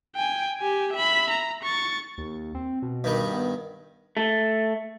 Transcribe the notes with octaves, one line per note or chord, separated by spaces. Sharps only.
G5 G#5
G4 G#5
E5 B5
A#5
C#6 A6
D#2
C4
B2
G2 D#3 G3
B3
A3